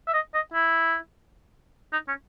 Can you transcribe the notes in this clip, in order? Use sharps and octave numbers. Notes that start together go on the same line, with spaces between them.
E5
D#5
D#5
E4
D#4
C#4